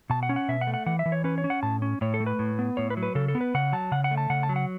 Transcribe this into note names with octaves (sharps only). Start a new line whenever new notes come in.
B2 A5
F#5
C#4
F#5
B2 E5
F#5
A3
F#5
E3 F#5
E5
E3
C#5
C#4 B4
C#5
C#4
F#5
A2 A5
C#4
A2 C#5
A4
A3
B4
A2
B3
A2 C#5
B4
F#3
B4
C#3 A4
A4
B3
B4
C#3 F#5
F#3 A5
C#3 F#5
F#5
A3
A5
C#3 F#5
A5
F#3
F#5